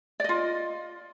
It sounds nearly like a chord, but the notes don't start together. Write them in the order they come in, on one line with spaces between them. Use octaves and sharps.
D5 D#5 F4